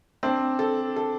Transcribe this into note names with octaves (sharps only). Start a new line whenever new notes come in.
C4 D4
A4
A4